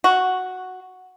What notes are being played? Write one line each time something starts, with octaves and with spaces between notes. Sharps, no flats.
F#4